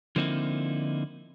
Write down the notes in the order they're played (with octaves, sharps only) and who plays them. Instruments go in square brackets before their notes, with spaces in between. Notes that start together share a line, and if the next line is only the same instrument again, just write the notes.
[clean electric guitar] D3 F3 A#3 C4 D#4 E4